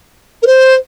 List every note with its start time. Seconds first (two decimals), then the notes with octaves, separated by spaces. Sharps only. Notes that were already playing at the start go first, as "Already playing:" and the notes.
0.42 A#4
0.47 C5